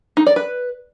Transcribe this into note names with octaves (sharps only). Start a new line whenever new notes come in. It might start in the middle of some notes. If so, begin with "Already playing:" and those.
D#4
D5
B4